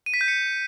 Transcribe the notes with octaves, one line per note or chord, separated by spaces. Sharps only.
D#7
B6
G6
C#7